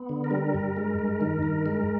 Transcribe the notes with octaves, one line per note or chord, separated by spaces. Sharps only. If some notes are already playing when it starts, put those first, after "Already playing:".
Already playing: B3
D3
A#4
G3
G2
G#3
G2
D#3
G2
G#3